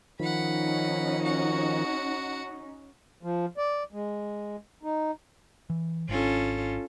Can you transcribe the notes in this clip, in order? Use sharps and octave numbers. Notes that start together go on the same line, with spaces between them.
D#3 F3 C#4 D#4 F#5 B5
F#4 F#5
F3
D5
G#3
D#4
E3
G#1 C#4 D4 F4 A4